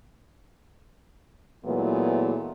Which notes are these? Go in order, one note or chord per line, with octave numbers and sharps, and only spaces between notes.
A#2 E3 F#3 G#3 A3 B3